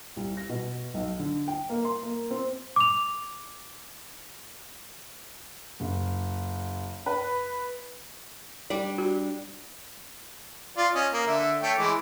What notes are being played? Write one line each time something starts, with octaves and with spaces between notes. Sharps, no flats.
C2
A#6
B2
B1
D3
G5
A#3
C6
A#3
C4
D6 F7
F#1
B4
G3 D4 D5
F#4
F4 D5
C#4 D#5
A#3
D3 E5
A3 C#5 G5
E3 G#3 D6